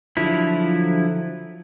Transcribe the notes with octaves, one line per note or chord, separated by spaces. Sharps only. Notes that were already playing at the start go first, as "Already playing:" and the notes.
D3 F3 F#3 E4